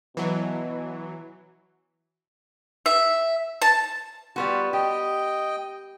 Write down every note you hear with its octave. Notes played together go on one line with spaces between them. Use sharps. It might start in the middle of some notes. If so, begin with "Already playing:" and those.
B2 E3 F#3
E5
A5
G3 B3 F4 F#4
G4 D#5 G5